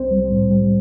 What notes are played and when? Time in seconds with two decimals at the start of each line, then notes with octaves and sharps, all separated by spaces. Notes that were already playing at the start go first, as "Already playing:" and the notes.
Already playing: C2 C4 C5
0.11 G3
0.31 A2
0.51 G3